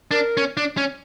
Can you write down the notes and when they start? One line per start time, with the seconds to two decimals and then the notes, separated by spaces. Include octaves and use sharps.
0.11 D4 A#4
0.37 C#4
0.57 D4
0.77 C#4